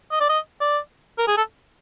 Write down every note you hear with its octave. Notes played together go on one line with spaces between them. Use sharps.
D#5
D5
D#5
D5
A#4
G#4
A4